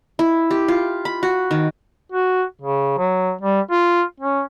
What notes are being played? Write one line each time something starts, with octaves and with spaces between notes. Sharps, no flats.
E4
G4
F4
B5
F#4
D#3
F#4
C#3
F#3
G3
F4
C#4